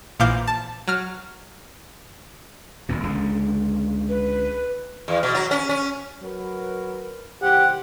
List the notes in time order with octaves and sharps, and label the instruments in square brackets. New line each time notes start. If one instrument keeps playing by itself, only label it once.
[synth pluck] A#1 A#2 E3 F5 D6 G6
A5
F#3 F6
[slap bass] D#1 F2 B2
C#2 D3 G#3
[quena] B4
[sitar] E2
B2
F#3
C#4
C#4
[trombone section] F#3 A#4 B4
[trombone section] C2 D#3 C5 [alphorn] G4 [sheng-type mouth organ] F#5